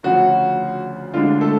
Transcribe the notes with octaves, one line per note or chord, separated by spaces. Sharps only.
D2 C#3 F3 F#4
D2 D3 G#3 D4 F4
A3 A4